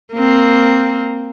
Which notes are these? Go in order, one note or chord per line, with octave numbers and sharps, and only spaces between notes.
A#3 C4